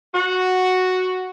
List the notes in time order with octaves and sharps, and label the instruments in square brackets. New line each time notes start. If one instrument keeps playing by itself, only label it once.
[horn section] F#4